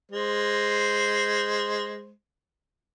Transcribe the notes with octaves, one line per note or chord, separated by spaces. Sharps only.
G#3 C5